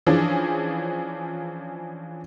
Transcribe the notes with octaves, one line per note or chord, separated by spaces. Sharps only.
E3 F3 C#4 D4 G#4